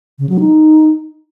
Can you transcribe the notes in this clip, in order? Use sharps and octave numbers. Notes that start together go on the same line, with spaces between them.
C#3
F#3
D#4